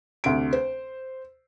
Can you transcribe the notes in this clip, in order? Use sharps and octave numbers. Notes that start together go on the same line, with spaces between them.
D2 C3 D7
C5